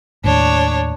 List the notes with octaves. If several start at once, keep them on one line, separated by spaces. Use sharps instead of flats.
D#2 A2 D4 C#5